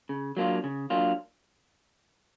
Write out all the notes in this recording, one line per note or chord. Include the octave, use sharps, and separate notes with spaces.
C#3
F#3 A#3 D4 F4
C#3
F#3 A#3 D4 F4